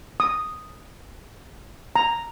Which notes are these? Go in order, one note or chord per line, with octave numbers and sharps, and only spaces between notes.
D#6
A#5